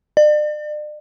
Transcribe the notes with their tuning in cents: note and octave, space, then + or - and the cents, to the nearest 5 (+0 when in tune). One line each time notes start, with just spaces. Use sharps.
D5 +40